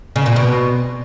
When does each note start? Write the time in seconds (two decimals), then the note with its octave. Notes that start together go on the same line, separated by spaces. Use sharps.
0.16 C#3
0.26 A#2
0.36 B2